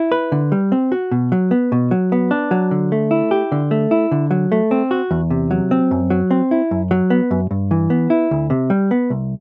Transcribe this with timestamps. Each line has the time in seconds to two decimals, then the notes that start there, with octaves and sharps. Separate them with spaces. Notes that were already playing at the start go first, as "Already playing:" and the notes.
Already playing: E4
0.12 B4
0.32 D3
0.52 G3
0.72 C4
0.92 F#4
1.12 B2
1.32 F#3
1.51 B3
1.72 B2
1.91 F#3
2.12 B3
2.31 D4
2.51 F#3
2.71 D3
2.92 A3
3.11 E4
3.31 G4
3.52 D3
3.71 A3
3.91 E4
4.12 D3
4.31 F#3
4.52 A3
4.71 C4
4.91 F#4
5.11 E2
5.30 C3
5.51 F#3
5.71 C4
5.91 F#2
6.10 F#3
6.31 C4
6.51 E4
6.71 F#2
6.91 F#3
7.10 B3
7.31 F#2
7.51 G2
7.71 E3
7.90 B3
8.10 E4
8.31 D2
8.50 C3
8.70 G3
8.91 B3
9.10 C2